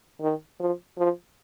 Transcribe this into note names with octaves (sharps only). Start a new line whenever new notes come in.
D#3
F3
F3